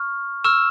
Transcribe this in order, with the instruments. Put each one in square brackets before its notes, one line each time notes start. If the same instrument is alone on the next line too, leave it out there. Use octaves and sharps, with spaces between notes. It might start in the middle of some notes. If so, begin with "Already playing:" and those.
Already playing: [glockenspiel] C#6 F6
C#6 E6 F6 E7